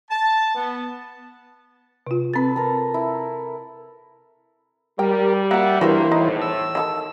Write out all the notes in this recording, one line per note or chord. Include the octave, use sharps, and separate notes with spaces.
A5
B3
C3 F4
C4 A4 B4 A6
A4 A#4
E4
G3 G4 A#4 G5
A#3 F#4 E5 F#5
G2 E3 A#3 E4 F#4 B4 C5 E5
E2 A2 D#4
E6
D#3 F4 A4